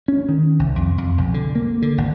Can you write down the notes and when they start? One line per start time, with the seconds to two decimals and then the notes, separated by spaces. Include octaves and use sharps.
0.08 C#4
0.29 D#3
0.59 C2
0.76 F2
0.98 F2
1.18 B1
1.34 D3
1.55 A#3
1.82 D3
1.98 G#1